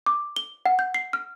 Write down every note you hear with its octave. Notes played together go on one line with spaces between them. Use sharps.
D6
G7
F#5
G6
C7
F6